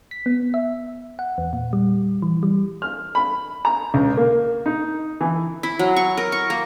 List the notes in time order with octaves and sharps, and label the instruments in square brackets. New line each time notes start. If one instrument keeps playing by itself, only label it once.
[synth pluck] B6
B3
E5
F#5
E2
A#2
G3
E3
G3
[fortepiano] F6
B5
A#5
C#2
A#3
D#4
E3
[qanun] E4
F#3
C#6
A#4
C#6
A#3